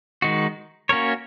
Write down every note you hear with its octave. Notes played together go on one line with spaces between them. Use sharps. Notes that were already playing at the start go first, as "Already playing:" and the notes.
D#3 G#3 D#4 F#4
A#3 C#4 F#4 A#4 C#5